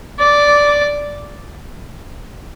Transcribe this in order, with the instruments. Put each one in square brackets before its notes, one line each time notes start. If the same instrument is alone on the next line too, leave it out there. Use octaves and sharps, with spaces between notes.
[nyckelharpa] D5